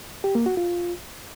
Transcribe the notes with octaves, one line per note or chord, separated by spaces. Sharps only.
G4
A#3
F#4
F4